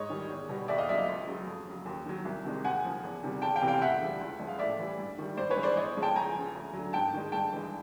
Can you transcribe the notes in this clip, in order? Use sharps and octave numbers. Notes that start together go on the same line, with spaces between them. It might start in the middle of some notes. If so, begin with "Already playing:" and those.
Already playing: G#2 C#5 D#5
D#3 G3
E2
B2 G3
D#2 D5 E5
D#5 F5
C#3 F#3 D5 E5
D#5 F5
C#2
C#3 F#3
F2
C#3 F#3
D#2
D#3 F#3
C2
C3 D#3 G#3
D#2 F#5 G#5
C#3 F3
E2
C3 D#3 G3
E2 G5 A5
F5 G5
C3 E3 G3
F5 G5
D2 E5 F#5
C#3 E3 G3
C#2
C#3 F3 G#3
F5
A2 D5 E5
E3 G3
G2
D#3 G3
G2 C5 D5
B4 C#5
E3 G#3
C5 D5
E2 C#5 D#5
C#3 F3 G#3
G5 A5
C#2 G#5 A#5
C#3 F3
D2
D3 F#3
G#2 G5 A5
D#3 G#3
G2 G5 A5
E3 G#3